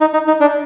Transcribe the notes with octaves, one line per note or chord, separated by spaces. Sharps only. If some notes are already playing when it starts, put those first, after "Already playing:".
D#4
D#4
D#4
D4